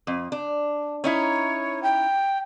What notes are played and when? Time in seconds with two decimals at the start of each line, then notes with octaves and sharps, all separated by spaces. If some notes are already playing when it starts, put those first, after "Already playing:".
0.07 F2
0.32 D4
1.04 C#4 D#4 E4 C#5
1.83 G5